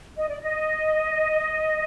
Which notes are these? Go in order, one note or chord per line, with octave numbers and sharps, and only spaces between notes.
D#5
D5
D#5